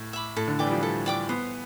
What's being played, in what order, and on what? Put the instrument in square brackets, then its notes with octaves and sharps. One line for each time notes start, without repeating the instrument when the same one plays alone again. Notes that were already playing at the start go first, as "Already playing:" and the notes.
Already playing: [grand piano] A2
[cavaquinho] E5 B5 D6
[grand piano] A2 [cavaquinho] A4
[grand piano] D3
[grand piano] E3 [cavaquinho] D5 G5 D6
[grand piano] G3
F3
[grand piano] G3 [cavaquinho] A4
[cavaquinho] D5 G5 D6
[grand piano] B3 [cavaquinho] C5